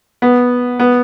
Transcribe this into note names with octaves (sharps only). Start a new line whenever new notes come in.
B3
B3